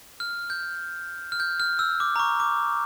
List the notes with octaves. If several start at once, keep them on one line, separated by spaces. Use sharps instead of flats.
F6
G6
F6
G6
F6
E6
D6
A#5
C#6
D6